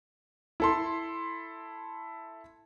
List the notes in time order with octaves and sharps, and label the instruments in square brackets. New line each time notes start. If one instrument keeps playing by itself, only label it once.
[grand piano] E4 A4 C6